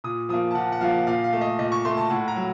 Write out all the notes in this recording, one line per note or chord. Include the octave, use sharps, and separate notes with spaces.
A#2 D#6
F3 A#3 D#6
A5
A#2 F#5
F#5
F3 A#3 F5
A#2 F5
F5
A3
D#5
A#2 D#5
C#6
A3 C6
A5
A2 F#5
A#5
F#3